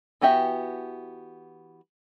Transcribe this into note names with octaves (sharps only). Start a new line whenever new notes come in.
E3 B3 F#4 G4 E5